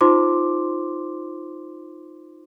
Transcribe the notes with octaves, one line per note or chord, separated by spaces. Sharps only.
D#4 F4 C5 C6 D6